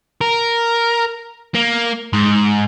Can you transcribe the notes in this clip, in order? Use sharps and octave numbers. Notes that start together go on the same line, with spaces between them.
A#4
A#3
G#2